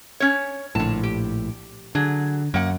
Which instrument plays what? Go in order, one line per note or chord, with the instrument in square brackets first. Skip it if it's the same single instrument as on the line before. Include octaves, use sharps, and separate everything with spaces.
[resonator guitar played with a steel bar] C#4 C#5
[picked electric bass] A#1 A2 [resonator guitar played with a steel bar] D3 A5
[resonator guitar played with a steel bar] G4
[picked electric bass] D3 [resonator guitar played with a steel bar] F#3 G#4
[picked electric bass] F#2 [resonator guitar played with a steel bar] A#3 F#5